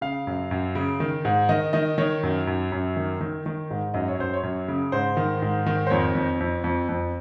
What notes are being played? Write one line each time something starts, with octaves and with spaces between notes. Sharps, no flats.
C#3 F5
F#2
F#2
C#3
D#3
G#2
D#3 D#5
D#3 D#5
D#3 C#5
F#2
F#2
F#2
D#3
D#3
D#3
G#2
F#2 D#5
C#5
F#2 C5
C#5
F#2
C#3
G#2 C5
D#3
G#2
D#3
C5
F2 C#5
F2
F2
F2
F2